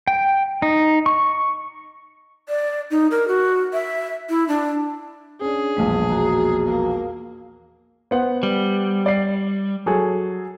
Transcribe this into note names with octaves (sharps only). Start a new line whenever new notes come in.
G5
D#4
C#6
D5
D#4
A#4
F#4
E5
E4
D4
C#4 D4 G#4
E1 A#1 G3 B3 A5
F#4 A#5
A#3
B3 C5 F#5
G3
D5 C7
F#3 G#4 A4